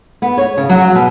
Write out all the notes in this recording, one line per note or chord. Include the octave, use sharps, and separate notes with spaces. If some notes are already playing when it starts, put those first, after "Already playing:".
B3
C#5
C#3
F#3
B2